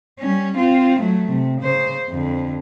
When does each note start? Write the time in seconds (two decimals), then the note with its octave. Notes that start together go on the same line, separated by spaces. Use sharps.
0.19 G3 C#4
0.58 C4 F4
1.01 F#3 A3
1.29 C3
1.61 C#3 C5
2.10 F2 D3